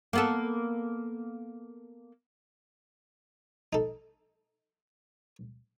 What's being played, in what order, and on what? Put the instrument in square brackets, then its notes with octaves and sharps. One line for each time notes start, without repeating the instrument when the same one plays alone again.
[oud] A#3 B3 A4
[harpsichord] D#4 A4